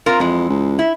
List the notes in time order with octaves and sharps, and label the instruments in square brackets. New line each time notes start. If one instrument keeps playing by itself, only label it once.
[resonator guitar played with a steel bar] C4 F4 A#4
[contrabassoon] F2 [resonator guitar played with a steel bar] E3 G#3
[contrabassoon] C#2
[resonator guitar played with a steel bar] E4